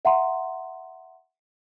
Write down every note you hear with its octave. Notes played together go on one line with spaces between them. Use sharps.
E5 F#5 A#5 C6